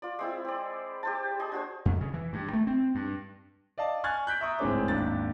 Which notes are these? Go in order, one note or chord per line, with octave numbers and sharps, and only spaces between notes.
F4 D5
G#3 C4 E4
C4 D5
G4 C5 A5
G#4 D#5
D4 F#4 C5
F2
C#3
E3
G2
A3
C4
G2
D5 D#5 F5 A5
G#5 C#6 F6 F#6 G#6 A6
F#6 G6 B6 D7
E5 A#5 C#6 D#6
D1 G#2 C4 G#4 C#5 D6
G#1 D#2 D4 A6